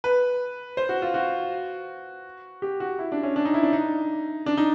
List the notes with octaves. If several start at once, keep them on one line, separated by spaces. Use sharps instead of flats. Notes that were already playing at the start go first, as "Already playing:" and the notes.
B4
C5
F#4
F4
F#4
G4
F#4
E4
D4
C#4
D4
D#4
E4
D4
D#4
D4
D#4